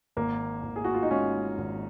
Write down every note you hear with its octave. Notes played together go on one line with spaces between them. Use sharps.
G#1 A#3
G#1
G#4
F#4
F4
D#4
G#2 C#4
G#1